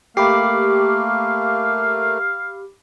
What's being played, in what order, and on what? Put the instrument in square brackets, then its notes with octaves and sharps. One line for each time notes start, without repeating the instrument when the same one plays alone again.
[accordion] A3 A#3 [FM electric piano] G4 [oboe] F5 [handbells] B5 D6 C7